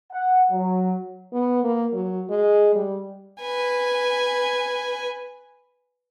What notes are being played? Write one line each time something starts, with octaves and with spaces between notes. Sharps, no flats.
F#5
F#3
B3
A#3
F#3
G#3
G3
B4 G#5